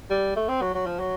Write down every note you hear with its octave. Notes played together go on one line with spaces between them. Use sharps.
G3
A3
C4
F#3
F#3
F3
F#3